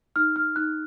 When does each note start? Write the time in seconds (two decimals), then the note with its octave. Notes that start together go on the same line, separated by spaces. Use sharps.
0.16 D#4 F6
0.36 F6
0.56 D#4 F#6